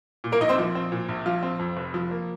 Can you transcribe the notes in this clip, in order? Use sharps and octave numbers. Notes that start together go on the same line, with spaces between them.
A#2
A#3 A#4
A#1 D#4 D#5
C4 C5
F3
C4
A#2
A#1
F3 F4
C4
F2
F1
F3
A#3